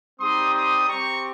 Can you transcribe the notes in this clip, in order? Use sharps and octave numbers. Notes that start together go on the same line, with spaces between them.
G3 C4 D#4 G4 C6 D#6
C6 D#6
C4 G4 A#5 C#6